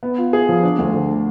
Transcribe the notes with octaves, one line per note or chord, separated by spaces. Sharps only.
B3
F4
G#4
F3
D4
D2
D3